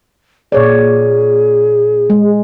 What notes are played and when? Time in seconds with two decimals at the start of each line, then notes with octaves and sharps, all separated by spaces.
0.52 A#2 G#4 C#5 D5
2.10 G#3